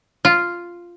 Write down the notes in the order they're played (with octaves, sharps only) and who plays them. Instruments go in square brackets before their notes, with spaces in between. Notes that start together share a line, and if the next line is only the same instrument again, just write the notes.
[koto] F4